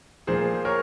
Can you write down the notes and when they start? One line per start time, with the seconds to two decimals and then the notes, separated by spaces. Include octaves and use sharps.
0.27 A#2 F3 G#4 C5
0.65 A#4 C#5